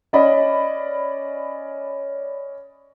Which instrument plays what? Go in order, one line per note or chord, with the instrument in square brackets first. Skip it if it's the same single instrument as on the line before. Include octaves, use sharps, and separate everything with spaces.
[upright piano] C#4 D5 D#5 B5